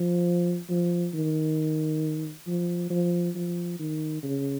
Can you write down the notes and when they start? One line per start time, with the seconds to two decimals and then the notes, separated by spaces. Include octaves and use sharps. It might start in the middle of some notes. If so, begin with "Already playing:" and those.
Already playing: F3
0.69 F3
1.14 D#3
2.47 F3
2.90 F3
3.35 F3
3.79 D#3
4.23 C#3